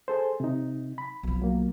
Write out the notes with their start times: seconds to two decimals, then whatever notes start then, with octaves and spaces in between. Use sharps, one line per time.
0.08 G#4 A4 C5
0.40 C3 D#4
0.98 B5
1.23 B1 F3
1.42 F#3 A#3